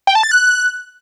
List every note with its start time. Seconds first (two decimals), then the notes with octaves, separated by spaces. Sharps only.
0.07 G5
0.15 A5
0.23 A6
0.31 F#6